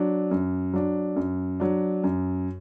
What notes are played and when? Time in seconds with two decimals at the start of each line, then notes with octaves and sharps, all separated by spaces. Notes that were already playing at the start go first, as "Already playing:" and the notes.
Already playing: F#3 D4
0.31 F#2
0.74 F#3 D4
1.16 F#2
1.60 F#3 D4
2.03 F#2